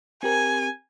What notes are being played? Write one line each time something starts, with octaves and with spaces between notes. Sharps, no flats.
C4 G4 A#4 G#5